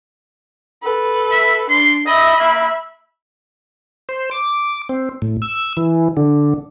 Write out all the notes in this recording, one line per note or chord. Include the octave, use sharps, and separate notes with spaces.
A4 B4
E5
D4 C6
D#5 E5 B5
A#3
C5
D6
C4
A2
E6
E3
D3